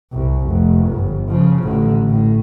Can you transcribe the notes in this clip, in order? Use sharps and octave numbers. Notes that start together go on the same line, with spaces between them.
C2
F1
G1
C#3 F3
A1 D3
A2